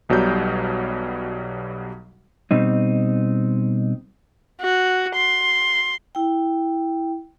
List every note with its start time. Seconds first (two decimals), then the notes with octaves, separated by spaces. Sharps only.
0.09 B1 B2 F#3 G3 G6
2.51 B2 G3 C4 D#4
4.61 F#4
5.15 C6
6.15 E4 G5